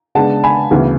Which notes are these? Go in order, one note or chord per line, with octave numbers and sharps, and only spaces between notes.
C#3 G#3 B3 D4 F#5 A5
G#5 B5
D2 C#3 E3 B3